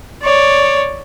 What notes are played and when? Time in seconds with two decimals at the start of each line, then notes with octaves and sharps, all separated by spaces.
0.23 C#5 D5